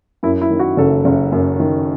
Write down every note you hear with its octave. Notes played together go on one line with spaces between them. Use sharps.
F#2 E4
E4
D#3
F#4
F#1 A4
F#1
F#2
D#3